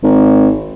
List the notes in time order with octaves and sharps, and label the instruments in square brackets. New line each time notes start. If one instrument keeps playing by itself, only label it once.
[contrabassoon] G#1